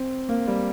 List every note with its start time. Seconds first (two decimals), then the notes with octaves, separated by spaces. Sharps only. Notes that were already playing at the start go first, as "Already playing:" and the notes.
Already playing: C4
0.29 A#3
0.48 G3